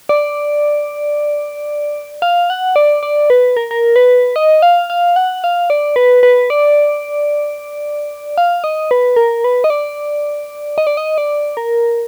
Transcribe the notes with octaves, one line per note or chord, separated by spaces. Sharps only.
D5
F5
F#5
D5
D5
B4
A#4
A#4
B4
D#5
F5
F5
F#5
F5
D5
B4
B4
D5
F5
D#5
B4
A#4
B4
D#5
D5
D#5
D5
D#5
D5
A#4